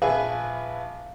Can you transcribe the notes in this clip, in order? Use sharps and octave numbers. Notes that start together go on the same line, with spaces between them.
A#1 G#4 B4 E5 G#5